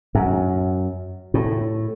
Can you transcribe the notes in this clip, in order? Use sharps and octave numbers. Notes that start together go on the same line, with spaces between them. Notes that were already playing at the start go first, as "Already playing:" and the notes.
F#2
A2